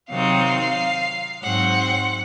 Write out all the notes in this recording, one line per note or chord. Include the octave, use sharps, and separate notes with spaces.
C3 D#3 F#3 C4 D#4 F5
G#2 F#3 C4 F#5